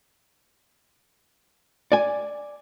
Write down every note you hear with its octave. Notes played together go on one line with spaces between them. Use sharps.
D5 G#5